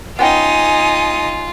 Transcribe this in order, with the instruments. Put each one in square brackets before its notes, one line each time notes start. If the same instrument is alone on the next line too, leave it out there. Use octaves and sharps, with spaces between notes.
[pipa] B3 C#4 G5 [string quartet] D#4 D#6 [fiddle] F4 [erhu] G#5